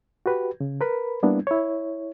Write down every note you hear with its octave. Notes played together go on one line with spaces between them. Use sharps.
F#4 G4 B4
C#3
A#4 B4 B5
G3 A#3 B3 D4 E4
E4 C#5